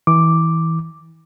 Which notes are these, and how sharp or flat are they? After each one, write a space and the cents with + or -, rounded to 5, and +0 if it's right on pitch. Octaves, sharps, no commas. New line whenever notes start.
E3 -25 D6 +0